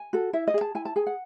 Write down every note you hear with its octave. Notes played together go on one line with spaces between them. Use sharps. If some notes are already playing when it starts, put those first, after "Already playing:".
Already playing: G#5
F#4 A4
E4 E5
D#5
G#4
A5
E4 G#5
A5
G#4 G#5
F#5